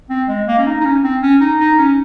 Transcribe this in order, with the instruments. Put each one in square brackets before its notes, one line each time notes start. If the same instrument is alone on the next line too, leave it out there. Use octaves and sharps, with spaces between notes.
[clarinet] C4
G#3
A#3
C#4
D#4
D#4
C#4
C4
C#4
D#4
D#4
C#4